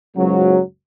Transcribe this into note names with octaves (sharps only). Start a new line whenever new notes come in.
F#1 C#2 G#2 C#3 F#3